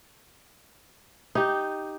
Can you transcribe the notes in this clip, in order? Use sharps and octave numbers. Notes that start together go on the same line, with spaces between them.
D#4 G4